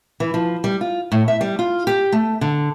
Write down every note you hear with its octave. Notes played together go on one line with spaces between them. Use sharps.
E3
F3
G3
F4
A2
E5
G3
F4
G4
A3
D3